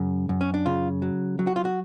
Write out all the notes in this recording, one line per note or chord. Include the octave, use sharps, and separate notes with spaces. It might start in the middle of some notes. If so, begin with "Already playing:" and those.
Already playing: F#2 C#3
F#2
C#4
D4
C#3 F4
F#3
F#3
F#4
F4
F#4